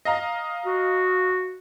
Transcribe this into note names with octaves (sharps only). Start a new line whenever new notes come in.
D#5 F5 A#5
F#4